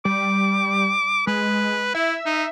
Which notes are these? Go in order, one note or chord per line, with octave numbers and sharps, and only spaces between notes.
G3 D6
G#3 B4
E4 E5
D#4